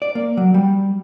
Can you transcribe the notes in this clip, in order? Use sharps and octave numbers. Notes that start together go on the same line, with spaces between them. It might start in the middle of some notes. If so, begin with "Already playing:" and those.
D5
A#3
F#3
G3